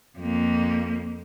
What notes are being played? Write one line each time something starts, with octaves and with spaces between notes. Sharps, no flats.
F2 A#3